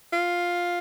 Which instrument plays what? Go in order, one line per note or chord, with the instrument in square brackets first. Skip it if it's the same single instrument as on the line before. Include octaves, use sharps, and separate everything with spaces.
[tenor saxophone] F4